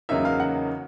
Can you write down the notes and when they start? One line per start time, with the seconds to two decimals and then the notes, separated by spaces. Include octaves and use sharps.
0.09 E2 C#3 F#3 A#3 D#4 E5
0.25 F5
0.40 F#5